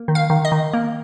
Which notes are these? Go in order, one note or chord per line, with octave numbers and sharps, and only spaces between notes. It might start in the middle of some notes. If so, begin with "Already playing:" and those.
Already playing: A#3
D#3
F5
D#3
D#5
D#3
A#3